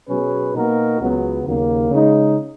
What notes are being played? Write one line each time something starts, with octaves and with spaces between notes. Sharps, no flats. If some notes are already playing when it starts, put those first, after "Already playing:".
B2 F#3 C#4 G#4 B4
B2 A#3 D#4 F#4 A#4
C#2 C#3 F#3 B3
D#2 C#3 F#3 A#3
C#3 G#3 D#4